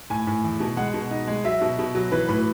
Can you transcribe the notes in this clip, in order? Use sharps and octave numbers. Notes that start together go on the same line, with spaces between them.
A2 G#5
A2
E2
B2
G#3 F#5
B2
D#4
G#3
F#3 E5
B2
B2
F#3
E3 B4
A2 B4